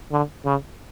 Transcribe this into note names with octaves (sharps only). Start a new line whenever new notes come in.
D3
C#3